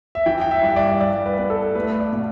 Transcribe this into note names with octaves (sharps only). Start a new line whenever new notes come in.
E5
E3 G5
G5
E5
G2
E5
D5
G2 D5
B4
B3
A4
A3 B4
D5
B2